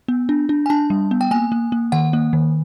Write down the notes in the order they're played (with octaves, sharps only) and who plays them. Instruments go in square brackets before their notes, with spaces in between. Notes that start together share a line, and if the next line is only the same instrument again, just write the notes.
[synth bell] B3
D4
D4
G#5
D4 A5
G3
B3
G5
A#3 G#5
A#3
A#3
D#3 F#5
A#3
D#3